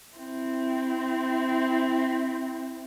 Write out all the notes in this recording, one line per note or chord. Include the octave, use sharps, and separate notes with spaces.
C4 E4